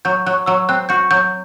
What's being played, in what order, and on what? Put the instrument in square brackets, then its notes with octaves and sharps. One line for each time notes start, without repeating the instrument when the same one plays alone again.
[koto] F#3 [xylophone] G6
[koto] F#3 [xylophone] F#6
[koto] F#3 [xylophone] E6
[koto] C4 [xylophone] F#6
[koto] F#4 [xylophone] G6
[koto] F#3 [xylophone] G6